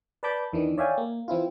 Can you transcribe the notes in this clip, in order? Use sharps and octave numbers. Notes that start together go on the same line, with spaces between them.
B4 D5 A5 B5 D6 G6
E2 D#3 E3 D4
C#5 D5 E5 F5 G5 G#5
A#3
E3 C4 E4 F4